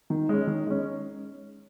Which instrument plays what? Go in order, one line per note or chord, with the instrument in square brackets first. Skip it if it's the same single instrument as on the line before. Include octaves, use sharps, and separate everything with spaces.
[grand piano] D#3
G#3 C#4
D#3
G#3 C#4